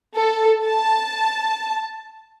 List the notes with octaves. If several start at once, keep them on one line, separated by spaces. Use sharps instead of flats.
A4
A5